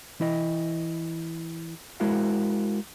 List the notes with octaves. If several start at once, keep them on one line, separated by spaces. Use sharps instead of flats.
E3 E4 D#5
G#3 E4 F#4 A#4 C5 F5